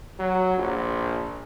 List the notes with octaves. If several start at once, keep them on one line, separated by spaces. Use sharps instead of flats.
F#3
A#1